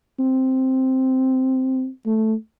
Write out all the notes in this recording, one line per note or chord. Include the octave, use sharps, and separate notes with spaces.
C4
A3